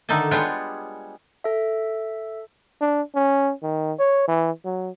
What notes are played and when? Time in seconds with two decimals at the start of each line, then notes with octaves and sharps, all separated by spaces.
0.09 D3 D#3 D#4 A4 E5 A5
0.31 G3 G#3 B3 D4 F4 C#5
1.44 A4 E5
2.81 D4
3.15 C#4
3.63 D#3
3.99 C#5
4.28 E3
4.65 F#3